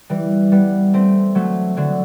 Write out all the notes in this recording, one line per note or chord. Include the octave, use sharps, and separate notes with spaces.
E3 G3
G3 B3
A3 C4
F#3 A3
D3 F#3